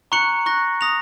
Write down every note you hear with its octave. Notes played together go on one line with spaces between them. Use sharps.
A#5 C#6 F#6 C#7 F#7
C#6 F#6 A#6
D#6 A#6 F7